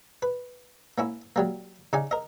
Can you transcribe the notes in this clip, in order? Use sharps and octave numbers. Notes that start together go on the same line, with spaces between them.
B4
A#3 C#4 E4
F#3 G3 A#3
C#3 D#4 D5 G#5
A#4 D#5